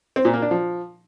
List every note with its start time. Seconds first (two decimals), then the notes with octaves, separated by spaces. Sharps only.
0.16 C4
0.25 A#2
0.34 A#3
0.42 D4
0.51 F3